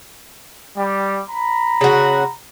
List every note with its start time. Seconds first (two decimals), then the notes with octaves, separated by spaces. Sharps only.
0.77 G3
1.30 A#5 B5
1.81 C#3 F#4